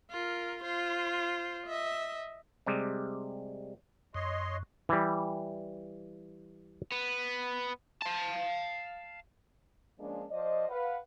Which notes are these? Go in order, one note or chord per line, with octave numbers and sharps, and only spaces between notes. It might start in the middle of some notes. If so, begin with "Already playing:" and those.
F4 A#4
F4 C5
D#5 E5
C3 G3 G#3
F#2 C#5 D#5 C6
E3 G3
B3
F5 A5
F3 G#3 A#3 C#4 D4
F3 C5 D5 D#5
B4 F5 F#5